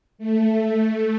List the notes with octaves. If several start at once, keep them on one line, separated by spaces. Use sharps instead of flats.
A3